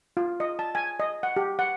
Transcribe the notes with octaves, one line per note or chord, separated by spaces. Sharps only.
F4
D#5
A5
G#5
D#5
F#5
G4
F#5